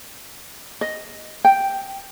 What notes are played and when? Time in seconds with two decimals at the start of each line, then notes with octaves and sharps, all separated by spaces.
0.81 D#5
1.45 G5